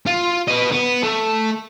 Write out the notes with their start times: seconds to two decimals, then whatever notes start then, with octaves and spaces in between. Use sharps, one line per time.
0.07 F4
0.48 B4 D#5
0.72 B3
1.03 A3